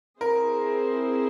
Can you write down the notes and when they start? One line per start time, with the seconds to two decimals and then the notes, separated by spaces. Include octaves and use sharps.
0.20 C4 E4 G#4 A#4 C5